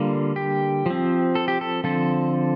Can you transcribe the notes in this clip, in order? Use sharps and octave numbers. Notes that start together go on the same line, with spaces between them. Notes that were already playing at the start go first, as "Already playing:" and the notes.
Already playing: D3 G3 A#3 F4
G4
F3 C4
A4
G4
A4
D3 F3 C4 A4